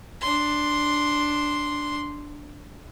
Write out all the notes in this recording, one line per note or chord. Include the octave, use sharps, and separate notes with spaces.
D4 C6